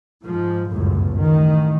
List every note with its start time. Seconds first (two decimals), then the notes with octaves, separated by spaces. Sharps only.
0.24 G#2 F3
0.69 G1 C#2 F#2 A2
1.19 A1 D#3